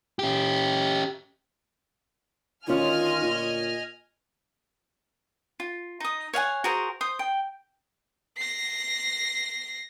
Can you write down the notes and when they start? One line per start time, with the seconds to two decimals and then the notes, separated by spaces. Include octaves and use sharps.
0.19 C#4 G4
2.67 D2 D#3 C#4 F4 D#5 G#5 F6
3.22 A#2
5.60 F4
6.00 D#4 D#6
6.34 C#5 F5 F#5 G#5
6.64 F#4 G#4 A#4 C5
7.01 C5 D#6
7.19 G5
8.37 A#6 C7